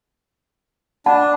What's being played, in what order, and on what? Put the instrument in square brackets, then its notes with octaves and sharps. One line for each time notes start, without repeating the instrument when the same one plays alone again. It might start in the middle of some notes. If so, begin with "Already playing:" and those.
[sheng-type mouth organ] D4 [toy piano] F#5 A5 B5